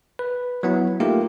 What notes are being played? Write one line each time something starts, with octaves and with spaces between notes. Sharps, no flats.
B4
F#3 B3 E4
A3 A#3 D#4 F4 G4 A#4